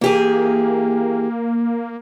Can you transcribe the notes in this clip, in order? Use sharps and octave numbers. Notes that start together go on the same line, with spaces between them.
E3 A#3 G4 G#4